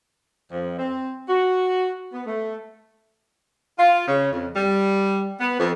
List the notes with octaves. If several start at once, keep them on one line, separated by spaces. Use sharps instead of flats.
F2
C4
F#4
B3
A3
F4
C#3
F2
G3
B3
F2